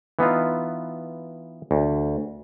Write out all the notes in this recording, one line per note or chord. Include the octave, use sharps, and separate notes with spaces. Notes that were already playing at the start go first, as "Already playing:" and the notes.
E3 B3 D#4 F4
D2